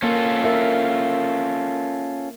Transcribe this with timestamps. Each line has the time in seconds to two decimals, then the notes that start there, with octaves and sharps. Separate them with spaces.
0.03 A#3 C#4 F4 A4
0.44 A#4 E5